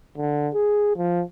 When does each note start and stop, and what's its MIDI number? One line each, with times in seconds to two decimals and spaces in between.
0.18 0.48 50
0.54 0.97 68
0.97 1.22 53